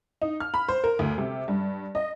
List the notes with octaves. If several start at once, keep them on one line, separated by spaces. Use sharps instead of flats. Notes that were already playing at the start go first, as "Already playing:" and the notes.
D#4
F6
B5
C5
A#4
D2
C3
G2
D#5